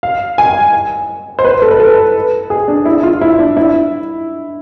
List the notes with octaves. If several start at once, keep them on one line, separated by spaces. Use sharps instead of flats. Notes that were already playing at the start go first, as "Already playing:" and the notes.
F5
G#5
C5
B4
A4
B4
A4
G#4
D4
E4
F4
E4
D4
E4